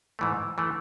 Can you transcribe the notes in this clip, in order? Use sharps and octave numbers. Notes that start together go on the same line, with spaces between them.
G#2 E3 A3
E3 A3